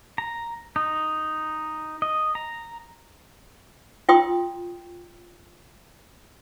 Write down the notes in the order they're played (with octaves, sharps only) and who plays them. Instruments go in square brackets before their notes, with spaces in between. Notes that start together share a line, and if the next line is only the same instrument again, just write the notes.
[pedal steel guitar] A#5
D#4
D#5
A#5
[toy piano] F4 G5 C6 D#6